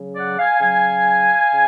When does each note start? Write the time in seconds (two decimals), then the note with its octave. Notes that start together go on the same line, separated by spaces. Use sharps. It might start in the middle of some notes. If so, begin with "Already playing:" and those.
Already playing: C#3 F#3
0.15 D5 F#5
0.38 F5 G#5
0.60 C#3 F#3 F5 G#5
1.51 C#3